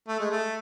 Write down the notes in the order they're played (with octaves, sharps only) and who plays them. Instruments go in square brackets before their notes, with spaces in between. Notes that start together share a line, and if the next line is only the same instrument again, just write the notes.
[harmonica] A3
G#3
A3